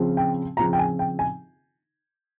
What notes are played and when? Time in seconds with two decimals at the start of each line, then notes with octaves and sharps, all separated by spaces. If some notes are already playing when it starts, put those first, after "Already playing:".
Already playing: C#3 F3 C4 F4
0.17 G5
0.57 C#3 F3 C4 F4 A#5
0.73 G5
0.79 G#5
0.99 G5
1.19 G#5